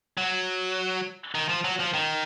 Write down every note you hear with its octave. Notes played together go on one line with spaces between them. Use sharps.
F#3
D#3
F3
F#3
F3
D#3